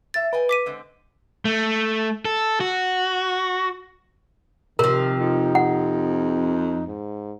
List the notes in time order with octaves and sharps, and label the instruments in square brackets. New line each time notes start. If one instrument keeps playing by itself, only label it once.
[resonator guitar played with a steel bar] G#2 E5 [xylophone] A6
[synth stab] B4 [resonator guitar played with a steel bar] D#5 G5 G#5
[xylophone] D6 B6 D#7
[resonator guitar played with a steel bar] D3 G#3 C4
[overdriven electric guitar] A3
A4
F#4
[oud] C3 F3 [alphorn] D#3 [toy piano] A#4
[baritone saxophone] F2 [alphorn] D#4
[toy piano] F#5
[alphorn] G#2